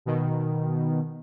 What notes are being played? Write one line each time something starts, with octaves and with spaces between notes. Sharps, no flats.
B2 D#3